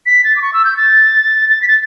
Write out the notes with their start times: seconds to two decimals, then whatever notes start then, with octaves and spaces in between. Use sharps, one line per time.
0.06 B6
0.24 A6
0.36 D6
0.42 C#6
0.53 E6
0.65 G6
0.77 A6
1.50 A6
1.62 B6
1.68 A6